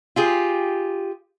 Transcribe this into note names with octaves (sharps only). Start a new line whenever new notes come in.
F4 G4 G#4